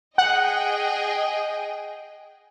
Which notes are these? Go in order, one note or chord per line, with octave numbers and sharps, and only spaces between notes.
G#4 D#5 F#5 G5